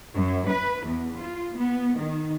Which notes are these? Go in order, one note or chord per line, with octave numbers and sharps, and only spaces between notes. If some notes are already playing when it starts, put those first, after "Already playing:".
F#2
B4
E2
F4
B3
D#3